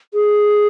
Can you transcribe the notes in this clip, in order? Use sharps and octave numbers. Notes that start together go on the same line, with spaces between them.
G#4